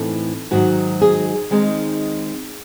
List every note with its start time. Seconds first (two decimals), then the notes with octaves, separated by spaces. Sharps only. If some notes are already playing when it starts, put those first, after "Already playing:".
Already playing: A2 E3 C4 D#4 A4
0.51 G#2 D#3 F#3 F#4
1.01 G#4
1.51 D#3 G#3 C4 D#4